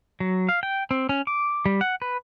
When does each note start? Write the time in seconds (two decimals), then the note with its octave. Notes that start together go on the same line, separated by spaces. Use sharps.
0.20 F#3
0.49 F5
0.63 G5
0.91 C4
1.09 C#4
1.27 D6
1.66 G3
1.81 F#5
2.02 B4